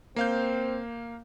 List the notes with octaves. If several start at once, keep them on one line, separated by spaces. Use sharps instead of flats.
A#3 C4 F5 G6